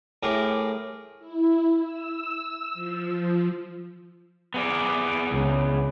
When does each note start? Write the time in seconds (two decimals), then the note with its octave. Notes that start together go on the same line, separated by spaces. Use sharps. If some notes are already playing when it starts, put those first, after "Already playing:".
0.23 A2 G4 G#4 A#4 D#6
1.19 E4
1.78 E6
2.74 F3
4.54 B3 G#4 D5
5.31 C#2